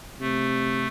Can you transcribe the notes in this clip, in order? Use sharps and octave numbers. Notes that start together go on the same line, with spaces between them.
C3 A3